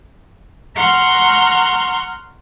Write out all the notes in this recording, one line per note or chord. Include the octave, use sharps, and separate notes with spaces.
F#5 A#5 C6 C#6 F6